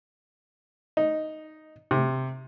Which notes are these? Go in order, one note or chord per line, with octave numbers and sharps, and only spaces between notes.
D#4
C3